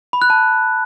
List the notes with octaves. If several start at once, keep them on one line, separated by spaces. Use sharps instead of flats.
B5
F#6
A5